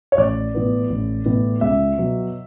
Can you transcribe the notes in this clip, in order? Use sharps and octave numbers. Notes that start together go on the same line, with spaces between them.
C#5
A1 D5
A2 E3 B3
A1
A2 E3 B3
C#2 E5
B2 F#3